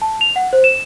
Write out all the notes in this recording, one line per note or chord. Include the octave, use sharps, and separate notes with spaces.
A5
F7
F#5
C5
E7